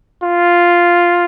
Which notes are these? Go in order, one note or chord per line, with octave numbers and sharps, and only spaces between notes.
F4